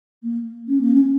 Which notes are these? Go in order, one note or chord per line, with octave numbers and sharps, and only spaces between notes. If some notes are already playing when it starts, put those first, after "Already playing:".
A#3
C#4
A#3
C#4